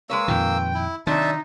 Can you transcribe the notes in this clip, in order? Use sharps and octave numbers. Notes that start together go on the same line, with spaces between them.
G#3 A#3 B4 C#5 E6
F2 A#2 D#3 G5
E4
C3 D#3 F#3 D4 D#4 E5 A5